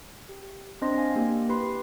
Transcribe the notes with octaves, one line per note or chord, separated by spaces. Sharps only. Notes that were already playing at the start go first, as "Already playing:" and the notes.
G4
C4 D4 C5 D#5 C6 A#6
F5 G#5
A#3 D4 G4
E4 G4 B4 B5 C6 C7